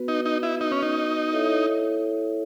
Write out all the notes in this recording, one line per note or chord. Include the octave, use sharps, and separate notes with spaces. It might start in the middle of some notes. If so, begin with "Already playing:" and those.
Already playing: B3 F#4 B4
D#4
D#4
E4
D#4
C#4
D#4
E4 A4 C#5 E5